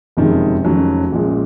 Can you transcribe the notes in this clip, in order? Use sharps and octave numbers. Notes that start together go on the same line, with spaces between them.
F#1 F2 C3 D#3 G#3
F1 F2 D#3 F#3 C#4
A#1 A#2 G#3 C#4